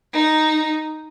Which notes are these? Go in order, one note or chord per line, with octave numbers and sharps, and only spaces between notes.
D#4